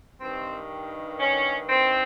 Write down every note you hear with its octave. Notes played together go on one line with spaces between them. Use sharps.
G2 D#3 C4
C#4
C4